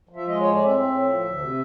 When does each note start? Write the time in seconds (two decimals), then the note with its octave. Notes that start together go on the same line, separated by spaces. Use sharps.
0.09 F3
0.16 E5
0.28 G#3 D#5
0.40 C#5
0.46 A2
0.53 D5
0.64 C4 E5
0.83 A2
1.02 F3
1.20 D2
1.38 C3